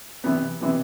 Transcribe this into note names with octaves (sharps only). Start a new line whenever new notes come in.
C3 E3 B3
C3 E3 B3